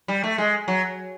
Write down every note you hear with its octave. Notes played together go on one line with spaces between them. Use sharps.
G3
A3
G#3
F#3